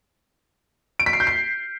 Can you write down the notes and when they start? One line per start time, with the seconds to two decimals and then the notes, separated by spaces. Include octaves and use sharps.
0.99 D7
1.06 B6
1.13 C7
1.20 G6
1.27 C7